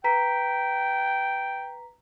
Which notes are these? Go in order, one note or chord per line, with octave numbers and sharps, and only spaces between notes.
B4 G5 A#5 B6